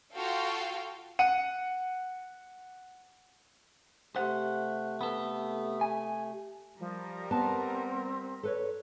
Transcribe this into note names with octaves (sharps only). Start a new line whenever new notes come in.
F4 F#4 A4 F5 G5
F#5 D#7
C3 A3 C5 F#5
B3 A4
G#5
F3 G3 A#4
B3 C4 A5
A4 B4 C#5